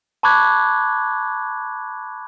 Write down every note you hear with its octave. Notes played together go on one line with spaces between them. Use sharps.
A5 B5 C#6 D6 F#6 G#6